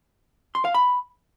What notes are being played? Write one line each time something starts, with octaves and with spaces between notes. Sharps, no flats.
C6
F5
B5